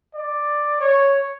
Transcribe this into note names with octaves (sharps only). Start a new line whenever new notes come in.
D5
C#5